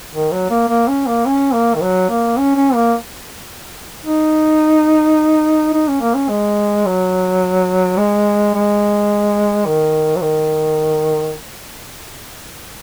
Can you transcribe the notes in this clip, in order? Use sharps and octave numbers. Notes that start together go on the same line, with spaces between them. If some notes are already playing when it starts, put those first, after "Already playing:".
D#3
F#3
A#3
A#3
C#4
A#3
C#4
A#3
D#3
F#3
A#3
C#4
C#4
A#3
D#4
D#4
C#4
A#3
C#4
G#3
F#3
G#3
G#3
D#3
F#3
D#3